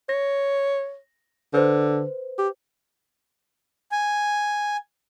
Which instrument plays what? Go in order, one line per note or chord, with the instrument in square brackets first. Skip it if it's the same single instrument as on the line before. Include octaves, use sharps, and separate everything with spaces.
[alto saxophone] C#5 [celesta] A#6
[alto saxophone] D3 [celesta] B4 C5
[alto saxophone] G4
[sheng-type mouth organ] G#5